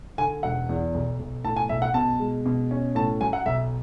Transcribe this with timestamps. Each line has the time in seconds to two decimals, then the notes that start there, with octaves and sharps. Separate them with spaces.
0.18 D3 G#5
0.43 E1 F#5
0.69 E2
0.94 B1
1.20 B1
1.44 A2 A5
1.56 G#5
1.69 B1 E5
1.82 F#5
1.94 B2 A5
2.19 G#3
2.46 B2
2.71 C#4
2.95 A2 A5
3.21 F#3 G#5
3.33 F#5
3.46 B1 E5